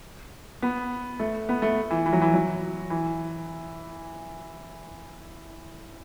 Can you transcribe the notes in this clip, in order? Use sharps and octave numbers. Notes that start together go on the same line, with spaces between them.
B3
A3
B3
A3
E3
E3
F#3
E3
F#3
E3